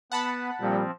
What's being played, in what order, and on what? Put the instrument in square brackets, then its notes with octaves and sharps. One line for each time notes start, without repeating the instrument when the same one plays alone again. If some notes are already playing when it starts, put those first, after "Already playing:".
[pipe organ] B3 B4 [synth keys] F#5 A5 B5
[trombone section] A#2 G3 [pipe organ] F3 C4